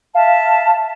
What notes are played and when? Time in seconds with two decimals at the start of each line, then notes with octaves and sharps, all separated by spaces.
0.15 E5 F5 A5